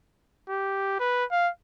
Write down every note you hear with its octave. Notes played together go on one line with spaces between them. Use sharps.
G4
B4
F5